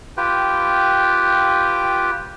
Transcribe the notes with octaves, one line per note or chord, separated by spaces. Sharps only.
F4 G4 B4 G5